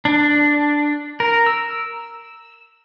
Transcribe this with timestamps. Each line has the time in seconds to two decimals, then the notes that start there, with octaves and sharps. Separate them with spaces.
0.05 D4
1.20 A#4
1.46 E6